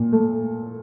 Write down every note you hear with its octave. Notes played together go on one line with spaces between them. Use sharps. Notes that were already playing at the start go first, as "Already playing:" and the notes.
Already playing: A#2
A3